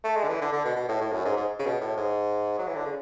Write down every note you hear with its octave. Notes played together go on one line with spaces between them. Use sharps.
A3
G#3
D3
E3
D3
D3
B2
B2
A2
A2
F#2
G#2
G#2
C#3
B2
A2
G#2
F#3
E3
D3
C#3